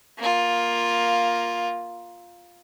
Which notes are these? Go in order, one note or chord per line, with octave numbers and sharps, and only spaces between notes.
A#3 F4